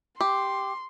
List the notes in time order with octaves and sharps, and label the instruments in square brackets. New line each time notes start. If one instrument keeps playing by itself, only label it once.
[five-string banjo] G4 [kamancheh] C6